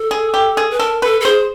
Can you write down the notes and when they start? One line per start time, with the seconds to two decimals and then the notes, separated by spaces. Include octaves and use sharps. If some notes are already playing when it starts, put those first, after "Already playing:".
Already playing: A4
0.11 G#4
0.34 G4
0.57 G#4
0.70 B4
0.79 A4 A#4
1.02 A4 B4
1.20 A4
1.25 G#4 C5